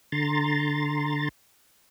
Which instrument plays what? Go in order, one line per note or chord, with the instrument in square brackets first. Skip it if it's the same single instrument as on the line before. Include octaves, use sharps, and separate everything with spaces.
[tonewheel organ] D3 A#5 C6 A6